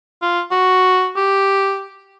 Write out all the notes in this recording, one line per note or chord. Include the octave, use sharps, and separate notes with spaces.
F4
F#4
G4